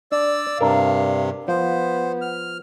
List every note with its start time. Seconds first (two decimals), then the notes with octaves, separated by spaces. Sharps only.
0.12 D4 D5 E6
0.61 G2 C3 D4 A#4 F5
1.48 F3 B3 C5
2.21 F6